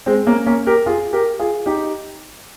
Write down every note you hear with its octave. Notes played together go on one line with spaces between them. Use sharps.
G#3 C4
A#3 C#4
A#3 C#4
G4 A#4
F4 G#4
G4 A#4
F4 G#4
D#4 G4